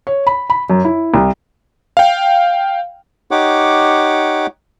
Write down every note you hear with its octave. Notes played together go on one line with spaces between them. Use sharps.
C#5
B5
B5
F#2
E4
C2
F5 G5
D#4 G4 C#5 F#5 D6